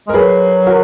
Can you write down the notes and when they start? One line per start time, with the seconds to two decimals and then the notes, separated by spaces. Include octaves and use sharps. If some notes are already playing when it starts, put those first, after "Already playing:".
0.07 G#3 A#4
0.14 F#3 G#4 B4
0.66 F#4 A#4